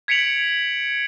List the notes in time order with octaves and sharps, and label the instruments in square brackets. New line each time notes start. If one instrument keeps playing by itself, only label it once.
[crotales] G#6 B6 C#7 D7 F7 F#7